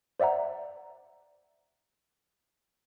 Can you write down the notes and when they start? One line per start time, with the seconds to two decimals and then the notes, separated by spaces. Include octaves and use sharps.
0.20 C5 D5 E5 F#5 A#5